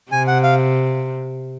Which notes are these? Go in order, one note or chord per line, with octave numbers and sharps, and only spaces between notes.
C3 G#5
F#5
F5